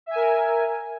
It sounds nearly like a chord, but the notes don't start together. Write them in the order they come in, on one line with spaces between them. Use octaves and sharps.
E5 G#5 A#4